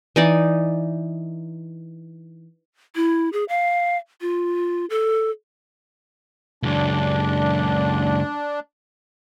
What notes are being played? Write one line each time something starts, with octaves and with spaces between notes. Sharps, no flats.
E3 D#4 D5
E4
G#4
F5
F4
A4
C#2 F#2 D4